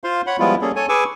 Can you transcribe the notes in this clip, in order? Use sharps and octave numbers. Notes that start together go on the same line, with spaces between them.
F4 C5 F5 C6
C#5 F#5 B5
F3 G3 G#3 B3 E4 F4
G3 A#3 C#4 G#4 A4
A4 C#5 G#5
G#4 B4 G#5 C#6 D6 E6